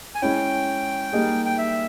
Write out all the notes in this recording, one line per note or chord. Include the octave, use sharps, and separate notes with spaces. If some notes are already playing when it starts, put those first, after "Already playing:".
G#5
G#3 C#4 E4 G5
G3 A#3 D#4 G#4
G5
E5